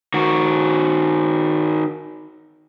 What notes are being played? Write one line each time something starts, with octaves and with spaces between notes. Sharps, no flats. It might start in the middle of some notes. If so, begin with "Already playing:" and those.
D#3 F#4